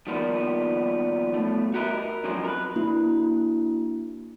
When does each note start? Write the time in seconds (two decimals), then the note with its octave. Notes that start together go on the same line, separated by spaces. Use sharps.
0.07 D#3 F3 G3 A#3 B3
1.34 B2 A3
1.74 F#4 G4 A#4 B4 D#5 E5
1.91 A#4
2.24 F2 C#3 F3 F#3 G#3 C4
2.44 A#4 B4
2.76 A#3 D4 E4 F#4